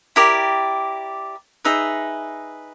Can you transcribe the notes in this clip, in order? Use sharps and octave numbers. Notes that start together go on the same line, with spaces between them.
E4 G4 A#4 D5
D#4 G#4 B4 E5